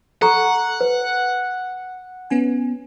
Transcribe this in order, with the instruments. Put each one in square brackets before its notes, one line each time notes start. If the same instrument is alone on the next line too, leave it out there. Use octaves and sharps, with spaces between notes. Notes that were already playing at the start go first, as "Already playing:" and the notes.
[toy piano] A4 A#5 C#6 [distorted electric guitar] F#5
[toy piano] B4
[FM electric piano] B3 C#4 G#5